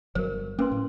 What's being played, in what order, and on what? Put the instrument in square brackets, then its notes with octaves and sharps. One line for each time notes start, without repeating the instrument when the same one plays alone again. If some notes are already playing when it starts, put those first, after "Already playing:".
[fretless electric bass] G1 F#3 [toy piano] A#4 C5
[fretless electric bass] A#3 [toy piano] C#4 B4 C6
[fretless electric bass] A2